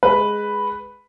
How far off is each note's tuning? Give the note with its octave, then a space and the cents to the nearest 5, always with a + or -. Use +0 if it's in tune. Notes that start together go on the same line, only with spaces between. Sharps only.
G#3 +0 B4 +0